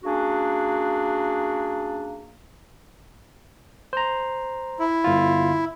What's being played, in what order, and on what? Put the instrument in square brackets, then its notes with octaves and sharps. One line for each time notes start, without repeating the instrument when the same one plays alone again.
[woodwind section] A#3 C#4 D4 F#4 G#4
[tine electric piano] C5 A#5
[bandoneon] E4
[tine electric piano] G1 F4